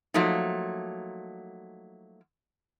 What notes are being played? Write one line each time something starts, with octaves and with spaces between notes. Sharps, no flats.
F3 F#3 A3 A#3 D#4